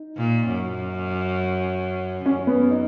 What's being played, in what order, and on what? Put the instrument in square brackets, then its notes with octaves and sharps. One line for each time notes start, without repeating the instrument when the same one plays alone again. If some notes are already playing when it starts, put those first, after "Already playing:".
Already playing: [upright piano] D#4
[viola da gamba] A#2
F#2
[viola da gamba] F#2 [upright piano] C#4
[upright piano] B3
D#4